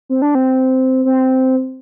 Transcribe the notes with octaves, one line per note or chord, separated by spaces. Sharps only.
C4
D4
C4
C4